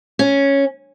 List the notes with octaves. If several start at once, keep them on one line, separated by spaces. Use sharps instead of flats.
C#4